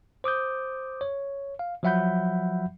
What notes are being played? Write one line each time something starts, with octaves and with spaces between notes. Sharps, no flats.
C5 D6 D#6 G6
C#5
F5
F3 F#3 E5 F#5 B5 G6